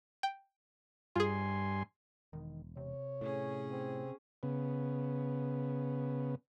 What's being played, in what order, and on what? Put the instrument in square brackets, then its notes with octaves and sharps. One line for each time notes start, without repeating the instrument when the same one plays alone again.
[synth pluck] G5
[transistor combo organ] G2 G#5 C6 [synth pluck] F4 G#4
[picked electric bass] E1 [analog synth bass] D#3
[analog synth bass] C3 [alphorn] C#5
[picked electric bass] A2 [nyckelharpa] C#4 G#4
[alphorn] C4
[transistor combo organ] C#3 B3